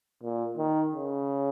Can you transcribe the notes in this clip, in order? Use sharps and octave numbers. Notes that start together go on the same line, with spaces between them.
A#2
D#3
C#3